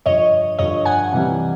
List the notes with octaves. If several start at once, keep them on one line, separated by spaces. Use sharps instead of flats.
G2 D3 F3 C#5 D#5
G2 D3 F3 C#5 D#5
F#5 G#5
C3 E3 G3